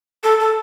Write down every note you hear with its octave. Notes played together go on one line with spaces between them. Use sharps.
A4
A4